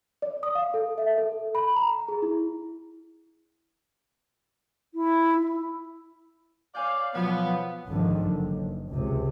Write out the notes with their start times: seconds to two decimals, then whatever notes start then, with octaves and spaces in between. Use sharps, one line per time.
0.22 D5
0.43 D#6
0.55 F5
0.74 A4
0.98 E5
1.18 A4
1.55 B5
1.76 A#5
2.08 G#4
2.22 E4
4.94 E4
6.75 C#5 D5 F5 G#5 G6
7.14 B2 F3 F#3 B3
7.87 G#1 D3 D#3 F3
8.22 F#1
8.90 C#2 C3